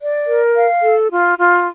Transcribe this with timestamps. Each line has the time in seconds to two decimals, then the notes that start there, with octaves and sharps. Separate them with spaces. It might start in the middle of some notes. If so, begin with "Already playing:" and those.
0.01 D5
0.27 A#4
0.55 F5
0.83 A4
1.11 F4
1.38 F4